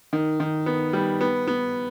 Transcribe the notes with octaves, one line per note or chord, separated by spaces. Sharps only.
D#3
D#3
B3
G3
B3
B3